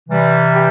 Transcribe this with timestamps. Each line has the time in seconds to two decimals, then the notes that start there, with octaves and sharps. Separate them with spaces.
0.09 C3 E3 G3
0.55 G4